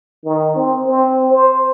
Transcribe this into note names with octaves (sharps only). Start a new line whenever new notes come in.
D#3
C4
C4
C5